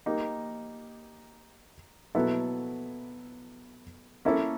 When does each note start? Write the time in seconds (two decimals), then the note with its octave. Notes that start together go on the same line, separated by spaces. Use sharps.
0.06 A#3 D#4 G4
2.15 B2 F#3 B3 E4 A4
4.25 A#3 C#4 E4 A4